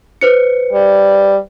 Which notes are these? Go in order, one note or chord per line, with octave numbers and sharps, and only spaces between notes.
B4 C5 C#7
G3